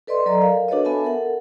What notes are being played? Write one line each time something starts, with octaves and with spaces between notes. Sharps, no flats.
A4 B4 D5 D#5 C6
F#3 A4 D5 D#5 A#5
A#4 F5
D4 F#4 A4 B4 C#5 D#5
B3 A4 E5 G#5 A5
A4 A#4 F#5